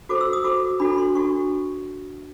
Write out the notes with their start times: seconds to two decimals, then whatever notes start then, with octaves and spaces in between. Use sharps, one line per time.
0.09 F#4 A4 C5 D6
0.21 E6
0.33 D#6
0.44 F#4 A4 C5 D6
0.80 D4 F#4 A4 B5
0.98 C6
1.15 D4 F#4 A4 C#6